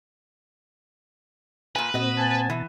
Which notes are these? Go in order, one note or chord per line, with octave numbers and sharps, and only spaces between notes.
A#2 B4 G#5
A#2 C4 F#4 D#5
G#5 A5
B2 E3 A5